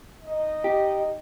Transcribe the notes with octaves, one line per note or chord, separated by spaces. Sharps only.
D#4 D#5
G4